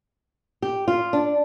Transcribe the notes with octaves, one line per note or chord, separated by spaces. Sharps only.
G4
F4
D4